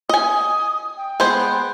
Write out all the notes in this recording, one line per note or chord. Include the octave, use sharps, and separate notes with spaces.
D#5 G#5 D#6
G5
G#3 B3 C5